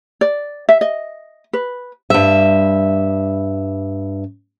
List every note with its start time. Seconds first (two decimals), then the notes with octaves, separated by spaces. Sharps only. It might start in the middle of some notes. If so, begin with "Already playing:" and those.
0.21 D5
0.69 E5
0.81 D#5
1.53 B4
2.10 G2 E5